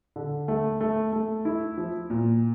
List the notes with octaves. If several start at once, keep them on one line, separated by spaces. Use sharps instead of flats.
D3
A3
A3
A3
E4
F3
A#2